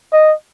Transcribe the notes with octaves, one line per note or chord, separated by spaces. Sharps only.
D#5